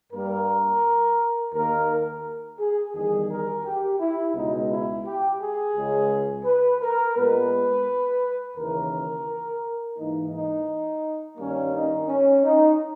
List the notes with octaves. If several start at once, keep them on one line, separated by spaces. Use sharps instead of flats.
G2 G3 A#3 A#4
D#2 D#3 A#3 A#4
A#4
G#4
E2 D#3 G3 G#4
A#4
G4
E4
C#2 B2 G#3 B3 D#4
E4
G4
G#4
C#2 C#3 G#3
B4
A#4
A#2 G#3 B3 B4
D#2 C#3 E3 A#4
G#2 E3 A#3 D#4
D#4
G2 D#3 G3 A#3 C#4
D#4
C#4
D#4